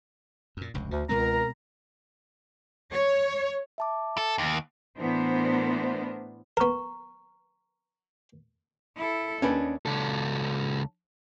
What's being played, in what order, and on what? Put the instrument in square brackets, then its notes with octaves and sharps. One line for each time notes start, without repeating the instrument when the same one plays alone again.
[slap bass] F#2 A#2
F1 C#2 G2
[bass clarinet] D2 [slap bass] D3
[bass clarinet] C#2 [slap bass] B2 G#3 C4 [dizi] A#4 [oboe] A#5
[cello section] C#5
[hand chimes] E5 A5 D6
[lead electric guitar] A4
D#2
[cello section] A2 E3 B3 D4 A#4 C5
[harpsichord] B3 A#4 [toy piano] A#5 C#6
[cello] E4 A4
[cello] D#2 [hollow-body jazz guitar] C#4 D4 B4
[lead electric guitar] C#2 A4